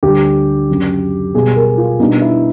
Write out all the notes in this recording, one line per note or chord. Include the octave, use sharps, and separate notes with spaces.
D2 D3 G3 G4
F#2 C#3 F#3
B2 G3 B3 G#4
A#4
F4
B2 G3 B3 D4 D#4
E4